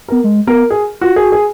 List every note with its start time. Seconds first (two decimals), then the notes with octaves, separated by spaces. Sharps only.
0.08 B3 A#4
0.24 G#3
0.47 B3 A#4
0.70 G#4
1.01 F4 F#4
1.16 F#4 G#4
1.32 G#4